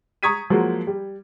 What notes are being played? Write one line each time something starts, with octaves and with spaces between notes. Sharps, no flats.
A#5 C#6 D#6 G#6 B6 D#7
F3 F#3 G#3 A#3 F#4
G3